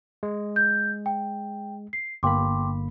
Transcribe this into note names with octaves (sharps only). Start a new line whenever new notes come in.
G#3
G6
G5
C7
G1 A#3 G5 B5 C6 D6